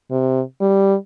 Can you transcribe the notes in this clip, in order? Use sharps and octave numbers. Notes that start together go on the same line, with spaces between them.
C3
G3